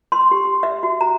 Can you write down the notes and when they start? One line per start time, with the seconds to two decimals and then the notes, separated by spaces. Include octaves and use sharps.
0.12 C6
0.31 G4
0.45 G4
0.63 E5
0.83 F#4
1.01 A#5